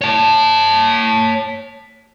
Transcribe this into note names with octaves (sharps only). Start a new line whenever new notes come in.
C#5 A5